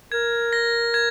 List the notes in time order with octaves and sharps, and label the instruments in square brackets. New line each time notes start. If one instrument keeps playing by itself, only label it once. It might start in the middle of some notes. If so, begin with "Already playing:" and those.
[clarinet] A#4 [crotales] G#6
[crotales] A#6
G#6